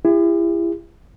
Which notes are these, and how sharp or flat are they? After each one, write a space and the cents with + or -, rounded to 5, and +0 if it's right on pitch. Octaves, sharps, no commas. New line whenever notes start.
E4 +30 G4 +45